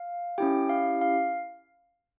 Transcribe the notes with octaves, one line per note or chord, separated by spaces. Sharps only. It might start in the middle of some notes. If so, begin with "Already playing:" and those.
Already playing: F5
C#4 E4 G4 G5
F5
F5